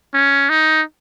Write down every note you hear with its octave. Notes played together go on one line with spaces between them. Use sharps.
C#4
D#4